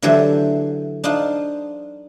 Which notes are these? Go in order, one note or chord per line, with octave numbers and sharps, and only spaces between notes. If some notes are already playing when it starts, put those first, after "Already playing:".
D3 E3 F#3 A3 G4 C5
D4 D#4 F4 C5